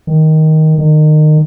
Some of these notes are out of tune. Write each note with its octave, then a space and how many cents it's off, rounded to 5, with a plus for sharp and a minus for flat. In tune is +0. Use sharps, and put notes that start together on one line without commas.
D#3 +10
D#3 -25